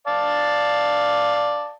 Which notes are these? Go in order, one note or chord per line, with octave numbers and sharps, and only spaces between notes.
D5 F5 A5